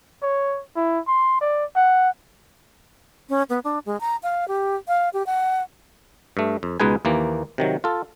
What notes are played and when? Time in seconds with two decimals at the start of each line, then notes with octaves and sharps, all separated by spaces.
0.22 C#5
0.76 E4
1.07 C6
1.41 D5
1.76 F#5
3.29 C#4
3.50 B3
3.64 D4
3.86 G#3
4.00 A#5
4.23 F5
4.48 G4
4.88 F5
5.14 G4
5.26 F#5
6.37 G2 A3
6.63 F2
6.80 C#2 B2 G#3 D#4 B4 G#5
7.05 D#2 E3 A#3
7.58 C3 D#3 F#3
7.84 F4 A4